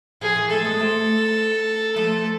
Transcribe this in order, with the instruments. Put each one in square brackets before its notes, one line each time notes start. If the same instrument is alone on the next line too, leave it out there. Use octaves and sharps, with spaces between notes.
[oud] F3 [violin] G#4
[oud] E3
[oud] F3 A3 [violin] A4
[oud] G#3 B3
A3 C4
[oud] F3 A3 [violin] A4